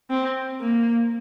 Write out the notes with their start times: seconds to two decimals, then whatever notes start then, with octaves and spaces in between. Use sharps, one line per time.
0.10 C4
0.61 A#3